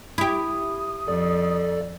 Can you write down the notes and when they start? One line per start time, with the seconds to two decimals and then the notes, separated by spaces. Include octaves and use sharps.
0.18 E4 G4 D#6
1.08 F2 A4 D5